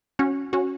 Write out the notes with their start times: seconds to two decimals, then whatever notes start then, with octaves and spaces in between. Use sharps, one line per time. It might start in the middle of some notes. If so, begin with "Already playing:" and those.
0.19 C#4 F#4
0.53 C#4 F#4